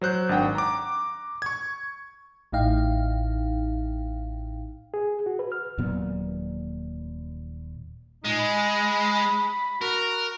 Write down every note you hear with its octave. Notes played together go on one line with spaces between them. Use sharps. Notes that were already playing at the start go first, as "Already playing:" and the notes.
F#3 C5 F#6 G6
G#1 D4 F#5 G5
A#5 D6
C#6 G#6
A1 A2 D#4 F5 G5
G#4
F#4
B4
F6
D#1 A#2 F#3 B3
A#2 G#3 D#4
B5
F#4 A#4